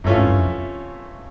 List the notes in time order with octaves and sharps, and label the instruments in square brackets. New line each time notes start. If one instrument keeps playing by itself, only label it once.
[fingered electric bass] G2 [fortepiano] C3 E3 A3 C#4 F4
[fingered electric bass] G#2
G2
F2